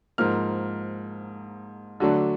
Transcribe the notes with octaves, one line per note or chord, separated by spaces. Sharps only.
G#2 F3 A#3 F6
D3 F#3 A3 D4